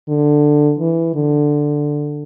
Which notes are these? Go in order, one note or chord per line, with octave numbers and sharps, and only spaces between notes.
D3
E3
D3